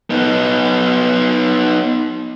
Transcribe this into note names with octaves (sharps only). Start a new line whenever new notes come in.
B3 D#4